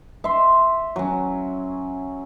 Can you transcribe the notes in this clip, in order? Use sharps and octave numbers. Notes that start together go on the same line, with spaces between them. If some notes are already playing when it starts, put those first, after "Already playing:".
E5 C6
F#3 C#4